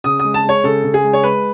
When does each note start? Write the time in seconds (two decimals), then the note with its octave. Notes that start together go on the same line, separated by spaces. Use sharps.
0.04 C#3 D#6
0.19 D#6
0.25 G#3
0.34 A5
0.44 G#3 C#5
0.64 C#3 A4
0.84 C#3
0.94 G#4
1.04 G#3
1.13 C#5
1.24 G#3 B4